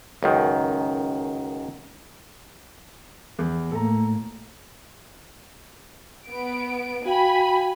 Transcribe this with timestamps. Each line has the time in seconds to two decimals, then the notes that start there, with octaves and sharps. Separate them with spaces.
0.23 C#2 F#2 D#3
3.39 E2
3.72 A2 A#3 A4 A#5
6.28 B3 D7
7.06 F#4 F5 G5 G#5 B5